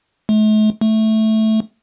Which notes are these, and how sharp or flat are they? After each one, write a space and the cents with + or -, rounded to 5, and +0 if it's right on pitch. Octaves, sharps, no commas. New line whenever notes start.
A3 -40
A3 -5